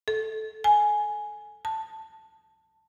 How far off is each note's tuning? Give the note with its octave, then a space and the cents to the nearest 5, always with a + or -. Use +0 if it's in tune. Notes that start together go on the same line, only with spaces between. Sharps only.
A4 -10
G#5 +5
A5 +10